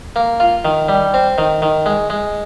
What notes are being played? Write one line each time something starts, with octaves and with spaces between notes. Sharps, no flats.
A#3
F4
D#3
G3
C4
D#3
D#3
G#3
G#3